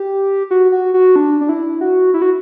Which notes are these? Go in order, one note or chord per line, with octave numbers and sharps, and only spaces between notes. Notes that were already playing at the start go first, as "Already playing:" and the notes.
Already playing: G4
F#4
F#4
F#4
D4
D4
E4
F#4
E4
F#4